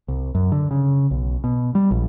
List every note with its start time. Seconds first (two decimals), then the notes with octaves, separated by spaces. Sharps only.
0.08 C2
0.35 F#2
0.52 D3
0.71 C#3
1.11 B1
1.44 B2
1.75 G3
1.91 A#1